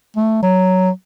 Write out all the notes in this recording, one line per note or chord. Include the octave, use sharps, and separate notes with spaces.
A3
F#3